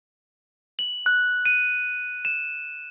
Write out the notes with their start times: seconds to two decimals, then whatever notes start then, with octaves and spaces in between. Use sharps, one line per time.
0.79 F#7
1.06 F#6
1.45 D#7
2.25 E7